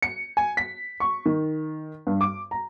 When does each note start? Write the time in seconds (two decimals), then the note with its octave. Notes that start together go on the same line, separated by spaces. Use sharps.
0.02 C#7
0.37 G#5
0.57 B6
1.00 C#6
1.26 D#3
2.07 G2
2.21 D6
2.51 A#5